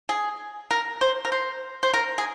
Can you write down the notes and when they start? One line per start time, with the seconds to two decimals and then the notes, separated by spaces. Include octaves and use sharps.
0.09 G#4
0.71 A#4
1.01 C5
1.25 A#4
1.32 C5
1.83 C5
1.94 A#4
2.18 G#4